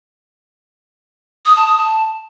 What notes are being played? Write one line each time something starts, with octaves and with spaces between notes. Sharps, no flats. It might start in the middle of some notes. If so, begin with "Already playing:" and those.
D#6
A5
D#6
A5